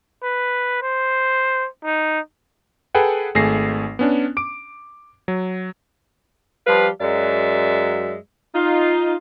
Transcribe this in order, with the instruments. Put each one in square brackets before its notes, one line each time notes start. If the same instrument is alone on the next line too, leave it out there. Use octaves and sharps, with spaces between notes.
[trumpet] B4
C5
D#4
[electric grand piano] G#4 A4 B4 F#5 G5
G#1 A3 G#4 A#6 C7
B3 C#4 D4
D6 D7
F#3
[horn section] F3 G3 G4 B4 F5
F#2 F#3 G#3 D5 E5
D#4 F4